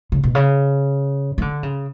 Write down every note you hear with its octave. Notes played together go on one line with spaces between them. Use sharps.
C#3
B2
C#3
E3
D3
C#3